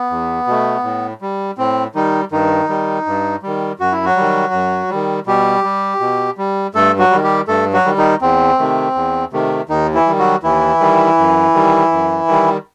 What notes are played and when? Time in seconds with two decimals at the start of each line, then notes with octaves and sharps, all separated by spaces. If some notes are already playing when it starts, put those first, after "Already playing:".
Already playing: B3
0.10 E2
0.47 B2 A3
0.84 A2
1.22 G3
1.58 A2 C4
1.95 D#3 G3 D#4
2.32 G2 D#3 D#4
2.69 D#3 G3
3.06 G2
3.43 D#3 G3
3.80 F#2 F#4
3.92 E4
4.05 F#3 F#4
4.16 D#3 G3
4.53 F#2
4.90 D#3 G3
5.27 B2 G3 G4
5.64 G3
6.00 B2
6.38 G3
6.75 G2 A3 A4
6.99 F#3 F#4
7.11 D#3 G3
7.24 G3 G4
7.48 G2 A3 A4
7.73 F#3 F#4
7.85 D#3 G3
7.97 D#3 D#4
8.21 E2 C4
8.59 C3 D#3 A3
8.95 E2
9.33 C3 D#3 A3
9.69 D#2 D#3 D#4
9.94 E3 E4
10.06 D#3 G3
10.19 F#3 F#4
10.43 D#2 E3 E4
10.80 D#3 G3
11.18 F#2
11.54 D#3 G3
11.91 F#2
12.28 D#3 G3